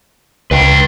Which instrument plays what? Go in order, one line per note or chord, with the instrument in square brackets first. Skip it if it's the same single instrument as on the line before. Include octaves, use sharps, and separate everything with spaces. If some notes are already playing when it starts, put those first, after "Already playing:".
[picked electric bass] C#2 [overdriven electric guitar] B4 G5